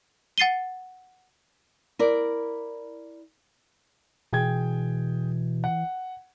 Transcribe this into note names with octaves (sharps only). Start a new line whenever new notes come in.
F#5 A6 C7 D#7 G7
E4 A#4 D5
B2 E3 G#4 G5 G#6
F#5